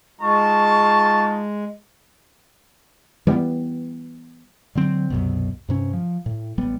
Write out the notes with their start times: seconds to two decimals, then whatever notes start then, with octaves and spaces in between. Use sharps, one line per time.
0.21 G#3 D#4 F4 A5 C#6
3.27 E3 G3 A3 B3
4.75 D3 F#3 C4
5.10 C2 F#2 B2
5.69 G2 C3 C#4
5.93 F3
6.26 A2
6.58 A1 G3 B3